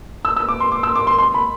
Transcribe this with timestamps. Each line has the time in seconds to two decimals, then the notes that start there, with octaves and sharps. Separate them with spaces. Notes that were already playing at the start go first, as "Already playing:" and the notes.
0.25 E6
0.36 E6
0.49 D6
0.60 C6
0.72 D6
0.83 E6
0.96 D6
1.07 C6
1.18 C6
1.34 B5